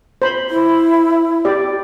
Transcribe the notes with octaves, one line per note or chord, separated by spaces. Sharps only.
C5 B5
E4
G4 D5